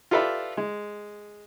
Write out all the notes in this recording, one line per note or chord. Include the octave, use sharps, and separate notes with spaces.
F4 G4 A4 B4 D5 E5
G#3